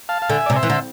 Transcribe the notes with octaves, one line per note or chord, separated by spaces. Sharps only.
F5 A5
F5
D3 E5 G#5
C3 D5
C5 E5
E3
D3